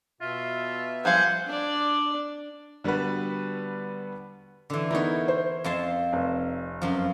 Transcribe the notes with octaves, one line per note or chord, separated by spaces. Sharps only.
B2 F4 E5
F3 G3 C5 F5 F#5 G#5
D4 D5
D3 G3 B3 F#4 B4
D3 E3
B3 D#4 E4 A#4 C#5
C5
F2 A5 C6
F1
F#2 F3